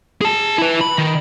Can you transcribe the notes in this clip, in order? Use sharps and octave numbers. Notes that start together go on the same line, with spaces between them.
G#4 A5
E4 B4
B5
D#3